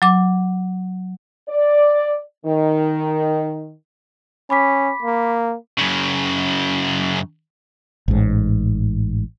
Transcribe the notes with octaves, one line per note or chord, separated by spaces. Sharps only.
F#3 D6
D5
D#3
C#4 B5 D6 B6
A#3
F#2 C#3
A1 G#2